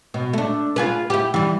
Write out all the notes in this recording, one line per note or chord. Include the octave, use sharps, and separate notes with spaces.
B2
A3 D4
F4 G#4 B4
E4 G4
E3 G3